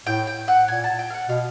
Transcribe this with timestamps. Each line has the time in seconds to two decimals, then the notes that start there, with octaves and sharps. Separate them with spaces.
0.06 A2 G5
0.27 G5
0.48 F#5
0.68 A#2 G#5
0.84 A5
0.99 G5
1.10 F5
1.14 F#5
1.29 B2 F5